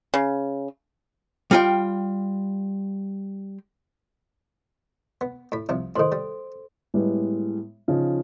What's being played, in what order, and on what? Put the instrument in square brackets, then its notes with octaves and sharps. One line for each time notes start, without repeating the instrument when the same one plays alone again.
[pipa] C#3
[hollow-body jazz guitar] G3 F4 G5
[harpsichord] B3
A2 B5
C2 C3 F3
[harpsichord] A2 D#3 [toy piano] A4 C5 C6
[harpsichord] G3
[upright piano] A2 G3 G#3 B3
C#3 F3 D#4